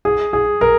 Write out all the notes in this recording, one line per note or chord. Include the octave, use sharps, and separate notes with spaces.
G#4
G#4
A#4